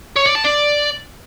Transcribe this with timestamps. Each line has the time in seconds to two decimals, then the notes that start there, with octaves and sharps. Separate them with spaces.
0.16 C#5
0.26 D5
0.35 A5
0.44 D5